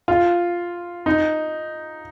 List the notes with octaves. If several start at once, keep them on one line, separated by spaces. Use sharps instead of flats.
F4
D#4